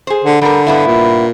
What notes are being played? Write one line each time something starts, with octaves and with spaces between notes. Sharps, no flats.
G#4 C5
D3
D3 G3 A#4
G2 B3 E4
A#2